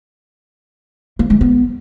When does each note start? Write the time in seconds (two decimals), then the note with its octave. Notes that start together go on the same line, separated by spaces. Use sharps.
1.19 A#3
1.30 G#3
1.41 B3